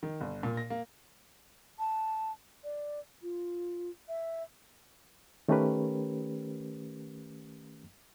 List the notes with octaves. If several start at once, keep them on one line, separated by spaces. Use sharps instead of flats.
D#3
G1
A#2
A#6
A#3
A5
D5
F4
E5
D#3 A3 C#4 G4 A#4 B4